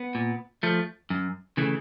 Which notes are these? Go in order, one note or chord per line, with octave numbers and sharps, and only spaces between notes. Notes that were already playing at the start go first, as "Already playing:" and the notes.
Already playing: B3
A#2
F3 A3
F#2
C#3 E3 A3